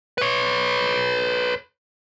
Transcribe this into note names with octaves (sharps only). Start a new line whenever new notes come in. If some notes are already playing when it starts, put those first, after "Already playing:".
B4 C#5